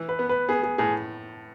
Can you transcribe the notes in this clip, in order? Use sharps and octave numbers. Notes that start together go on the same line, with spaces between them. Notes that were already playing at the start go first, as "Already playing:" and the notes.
Already playing: E3
B4
B3
B4
B3 G#4
G#4
A2 G#4